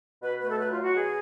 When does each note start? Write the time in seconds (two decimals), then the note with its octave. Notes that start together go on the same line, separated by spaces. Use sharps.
0.22 B2 B4
0.39 A3 B4
0.50 A4
0.58 F#3 B4
0.70 F4
0.76 F#3
0.82 F#4
0.94 B2 G#4